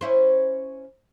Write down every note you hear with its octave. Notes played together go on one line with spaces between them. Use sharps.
C#4 E4 C5